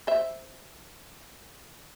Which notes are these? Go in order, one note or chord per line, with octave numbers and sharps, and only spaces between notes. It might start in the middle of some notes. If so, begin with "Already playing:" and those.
C5 E5